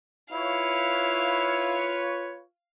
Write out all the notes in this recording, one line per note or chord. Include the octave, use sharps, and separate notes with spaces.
E4 F4 B4 C#5 F5